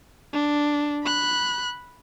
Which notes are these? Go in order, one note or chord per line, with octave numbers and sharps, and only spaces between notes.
D4
B5 F#6